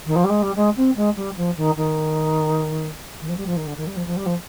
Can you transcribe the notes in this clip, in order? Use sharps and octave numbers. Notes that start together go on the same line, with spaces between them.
D#3
F3
G3
G#3
G3
G#3
C4
G#3
G3
F3
D#3
D#3
D#3
F3
G3
F3
D#3
D3
D#3
G3
F3
F3
G3
F3